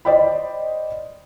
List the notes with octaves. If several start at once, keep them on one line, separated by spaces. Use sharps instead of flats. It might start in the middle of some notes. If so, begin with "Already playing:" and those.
C5 D5 D#5 G5 B5